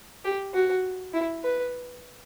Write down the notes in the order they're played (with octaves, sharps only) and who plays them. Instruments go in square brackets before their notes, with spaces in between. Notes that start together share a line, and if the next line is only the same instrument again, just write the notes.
[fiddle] G4
F#4
E4
B4